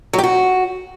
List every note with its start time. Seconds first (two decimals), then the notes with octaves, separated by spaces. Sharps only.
0.13 F#3
0.18 G4
0.23 F#4